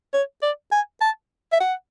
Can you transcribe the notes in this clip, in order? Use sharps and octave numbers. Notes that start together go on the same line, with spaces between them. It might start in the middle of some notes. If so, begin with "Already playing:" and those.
C#5
D5
G#5
A5
E5
F#5